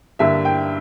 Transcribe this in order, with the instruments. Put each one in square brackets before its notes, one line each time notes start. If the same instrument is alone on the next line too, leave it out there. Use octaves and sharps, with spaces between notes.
[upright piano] G2 D3 A#3 E5
G5